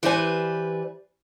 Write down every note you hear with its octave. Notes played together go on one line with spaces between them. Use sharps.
E3 G4 B4 C5 D5 G#5